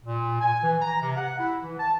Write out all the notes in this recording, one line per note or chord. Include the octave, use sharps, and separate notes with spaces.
A#2
G#5
E3
A#5
C3
F#5
E4
E3
A5